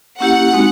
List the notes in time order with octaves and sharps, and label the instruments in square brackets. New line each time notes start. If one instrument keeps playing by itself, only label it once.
[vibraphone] A#3 C#4 E4 G4 [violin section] F#5
[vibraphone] G#3 C4 D#4 F#4